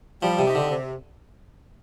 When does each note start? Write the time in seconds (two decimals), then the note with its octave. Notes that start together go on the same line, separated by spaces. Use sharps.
0.23 F3 G3
0.39 C3
0.47 C4 D#4 G4
0.55 D3
0.71 C3